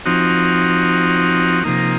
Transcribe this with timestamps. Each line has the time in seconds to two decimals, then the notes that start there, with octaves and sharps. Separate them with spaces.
0.05 F3 C4 D#4 F#4
1.64 C3 F3 A#3 D#4